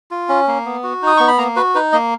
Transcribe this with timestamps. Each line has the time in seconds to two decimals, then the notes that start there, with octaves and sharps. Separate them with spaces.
0.11 F4
0.29 C#4
0.48 A#3
0.65 B3
0.83 F#4
1.02 D#4 D#6
1.17 B3 C#6
1.28 B5
1.38 A#3 A#5
1.56 F#4 B4
1.75 D#4 B4
1.92 A#3 D#5